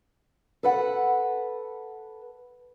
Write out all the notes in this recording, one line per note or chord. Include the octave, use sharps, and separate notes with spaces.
A4 B4 F#5